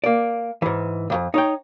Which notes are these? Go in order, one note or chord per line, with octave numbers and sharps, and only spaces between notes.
A#3 D5
G#2 E3
C2 F2
D#4 C#5 G5